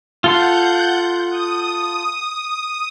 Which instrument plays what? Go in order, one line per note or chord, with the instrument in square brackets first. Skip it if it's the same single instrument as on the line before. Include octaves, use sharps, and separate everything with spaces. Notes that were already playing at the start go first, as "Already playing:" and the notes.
[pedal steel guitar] F4 A4 C6 [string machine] F#5 G6
[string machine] D#6